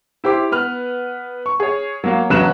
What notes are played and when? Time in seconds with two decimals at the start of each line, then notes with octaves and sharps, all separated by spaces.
0.24 E4 G4 C5 D6
0.52 B3 B4 F6
1.46 C#6
1.60 G#4 C#5
2.04 F#3 A#3 F5
2.30 E1 C#3 F#3 B4 F#6 E7